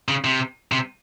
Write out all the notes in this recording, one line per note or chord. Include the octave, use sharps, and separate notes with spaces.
C#3
C3
C3